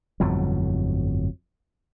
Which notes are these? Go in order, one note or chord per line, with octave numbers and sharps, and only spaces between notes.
G1 F2 A2 F#3